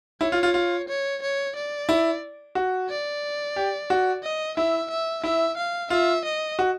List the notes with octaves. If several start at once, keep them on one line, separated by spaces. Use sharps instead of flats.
E4 C#5
F4
F4
F4
C#5
C#5
D5
E4
F#4
D5
G4
F#4
D#5
E4 E5
E5
E4 E5
F5
F4 E5
D#5
F#4